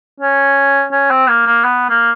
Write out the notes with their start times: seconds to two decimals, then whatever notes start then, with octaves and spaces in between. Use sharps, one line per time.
0.20 C#4
0.92 C#4
1.10 C4
1.29 A#3
1.46 A#3
1.64 B3
1.90 A#3